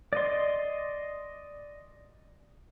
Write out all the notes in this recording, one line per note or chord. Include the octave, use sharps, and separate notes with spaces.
D5 D#5 C6